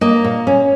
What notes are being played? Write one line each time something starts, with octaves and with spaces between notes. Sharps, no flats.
A#3 D#5
A#2
C#4